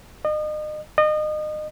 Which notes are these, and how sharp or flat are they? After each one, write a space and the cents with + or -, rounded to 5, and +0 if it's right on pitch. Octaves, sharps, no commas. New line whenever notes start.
D#5 -35
D#5 -30